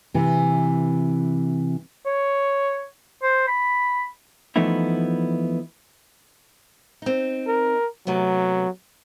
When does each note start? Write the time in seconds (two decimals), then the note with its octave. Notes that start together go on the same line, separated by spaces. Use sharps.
0.14 C3 E3
2.06 C#5
3.23 C5
3.48 B5
4.56 E3 F3 A3 B3 D#4 E4
7.02 C4 D#4
7.47 A#4
8.07 C3 F#3 A3 B3